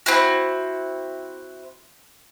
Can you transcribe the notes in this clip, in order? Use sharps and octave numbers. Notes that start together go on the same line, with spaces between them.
C4 E4 F#4